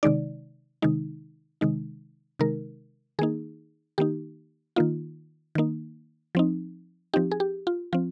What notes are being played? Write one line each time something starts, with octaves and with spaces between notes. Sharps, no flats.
C3 D#3 G#3 D#4 D5
C3 D#3 G#3 D#4
C3 D#3 G#3 D#4
C3 D#3 G#3 D#4 A#4
D#3 A#3 D#4 G#4
D#3 A#3 D#4 G4
D#3 A#3 D#4 F4
D#3 A#3 D#4
F3 C4 D#4
F3 C4 D#4 G4
G#4
G4
F4
F3 C4 F4